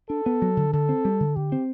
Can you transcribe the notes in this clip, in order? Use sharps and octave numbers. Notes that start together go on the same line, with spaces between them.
D4 A4
B3
F#3
D3
D3 A4
C4
G3
D3
D3 G4
C4